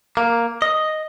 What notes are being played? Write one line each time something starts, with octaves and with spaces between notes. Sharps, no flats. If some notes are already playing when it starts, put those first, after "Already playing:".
A#3
D#5